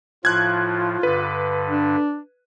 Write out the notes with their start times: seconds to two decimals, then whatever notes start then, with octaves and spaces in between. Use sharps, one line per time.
0.25 A2 F3 F4 F#6 G#6
1.03 G2 D3 B4
1.69 D4